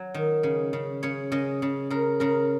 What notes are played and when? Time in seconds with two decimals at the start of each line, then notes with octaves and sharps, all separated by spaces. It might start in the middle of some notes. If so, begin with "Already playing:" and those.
Already playing: F#3
0.14 D#3
0.43 C#3
0.73 C#3
1.03 C#3 C#5
1.32 C#3 D#5
1.62 C#3
1.90 C#3 A#4
2.20 C#3 A#4